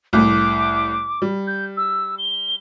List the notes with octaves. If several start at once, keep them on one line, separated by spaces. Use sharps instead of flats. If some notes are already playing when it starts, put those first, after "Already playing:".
C2 A2 D6
G3
G6
E6
G7